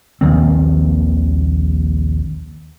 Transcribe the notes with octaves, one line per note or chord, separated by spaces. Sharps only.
A#1 D#2 D#3 C4